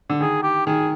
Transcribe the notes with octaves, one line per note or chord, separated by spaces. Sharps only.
D3
D#3 G#4
G4
D#3 G#4